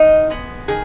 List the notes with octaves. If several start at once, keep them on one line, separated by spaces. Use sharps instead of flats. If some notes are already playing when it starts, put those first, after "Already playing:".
Already playing: D#3 D#4 D#5
G#3 B3
D#3 G#4